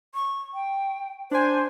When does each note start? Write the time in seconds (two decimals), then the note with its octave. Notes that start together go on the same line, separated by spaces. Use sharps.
0.15 C#6
0.54 G5
1.31 D4 C5 G#5